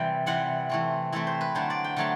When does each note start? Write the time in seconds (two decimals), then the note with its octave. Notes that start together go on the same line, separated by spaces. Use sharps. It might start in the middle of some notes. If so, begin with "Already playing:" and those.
Already playing: C3 E3 G3 G5
0.26 C3 E3 G3 F#5
0.70 E3 A3 C4
1.12 E3 A3 C4 E5
1.27 C5
1.41 B4
1.55 D3 F#3 A3 C5
1.70 D5
1.84 G5
1.96 D3 F#3 A3 A5